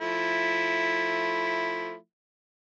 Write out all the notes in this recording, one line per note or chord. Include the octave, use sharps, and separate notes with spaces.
F3 A3 E4